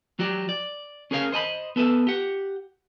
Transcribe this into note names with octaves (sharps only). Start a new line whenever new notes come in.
F#3 F#4 G4 D5
D5
C#4 G#4 A#4 C#5 F5
C5 D#5 A5 B5
B3 A4 B4 E5
G4 F#5